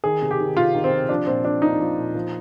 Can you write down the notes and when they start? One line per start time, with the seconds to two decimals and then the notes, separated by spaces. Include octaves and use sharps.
0.04 D#3 G#4
0.22 C3
0.31 G4
0.40 D#3
0.57 C3 F4
0.74 D#3
0.84 C4
0.92 C3
1.09 F3 D4
1.27 A#2 C4
1.44 F3 D4
1.62 A#2 D#4
1.80 F3
1.98 A#2
2.15 F3